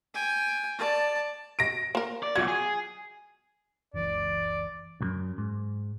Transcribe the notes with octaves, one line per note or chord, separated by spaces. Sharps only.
G5 G#5
D5 A5
A#6 D7
A#3 A#4
D5
B1 F4 F#4 G#6
G#4
F#1 C#2 E3 D5
C2 F#2
G#2